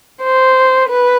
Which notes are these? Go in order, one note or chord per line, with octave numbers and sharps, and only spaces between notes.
C5
B4